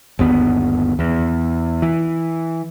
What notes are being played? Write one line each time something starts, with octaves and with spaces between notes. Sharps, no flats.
G1 D#2 B3
E2
E3